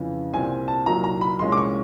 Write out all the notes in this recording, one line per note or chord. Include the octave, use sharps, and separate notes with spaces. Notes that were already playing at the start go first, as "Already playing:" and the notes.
Already playing: F2 C#3 E3
C2 A#2 G3 C4 G#5
A5
C2 A#2 F#3 A#3 D#4 A#5
A#5
B5
C2 A#2 F3 G#3 C#4 C6
D6
C#6